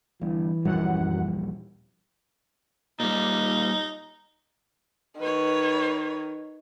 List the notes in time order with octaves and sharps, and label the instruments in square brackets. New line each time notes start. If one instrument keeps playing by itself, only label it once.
[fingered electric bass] G1 G2 [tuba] E3
[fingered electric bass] D#1 A#1 G3 [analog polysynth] F#2 F#5
[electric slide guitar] A#2 G3 [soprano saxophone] D#4
[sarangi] D#3 [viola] B4 C#5